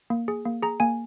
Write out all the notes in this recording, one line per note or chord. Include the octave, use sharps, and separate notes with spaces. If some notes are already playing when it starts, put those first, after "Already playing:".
A#3
G#4
A#3
G#4 A#5
A#3 G#5